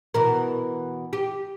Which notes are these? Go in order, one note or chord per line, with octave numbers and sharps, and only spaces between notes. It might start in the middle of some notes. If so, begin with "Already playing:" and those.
B2 E3 A#4
G4